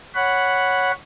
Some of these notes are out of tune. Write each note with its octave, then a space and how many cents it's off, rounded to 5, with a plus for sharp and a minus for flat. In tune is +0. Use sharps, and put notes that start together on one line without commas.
C#5 +0 F#5 +0 B5 +0